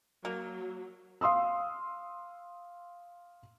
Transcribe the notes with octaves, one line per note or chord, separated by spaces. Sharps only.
F#3 A#3
F5 C6 D#6 E6